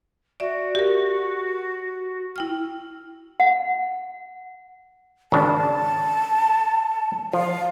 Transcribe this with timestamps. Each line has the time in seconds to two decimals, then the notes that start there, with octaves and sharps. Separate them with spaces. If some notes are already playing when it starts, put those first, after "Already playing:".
0.40 F#4 D5 E5
0.75 G4 A#4
2.36 E4 G5 F6
3.40 F#5
5.32 G#1 C#3 D4 A5
7.33 F3 F5